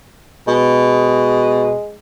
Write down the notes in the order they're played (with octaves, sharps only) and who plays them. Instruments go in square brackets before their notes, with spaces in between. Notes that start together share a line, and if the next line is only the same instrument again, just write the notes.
[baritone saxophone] B2 [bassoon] G#3